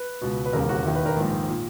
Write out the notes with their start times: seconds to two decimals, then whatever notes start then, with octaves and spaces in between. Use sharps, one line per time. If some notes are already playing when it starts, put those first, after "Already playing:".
Already playing: B4
0.21 C#2 B2
0.45 B4
0.53 E1 D#2 C#3 A#4
0.69 F#4
0.85 E1 D#2 D#3 E4
0.95 B4
1.06 A#4
1.16 A#1 G#2 D#3
1.49 A#2